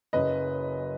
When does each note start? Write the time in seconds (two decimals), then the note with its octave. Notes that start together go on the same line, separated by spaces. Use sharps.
0.13 F#1 F#2 C#3 B4 D#5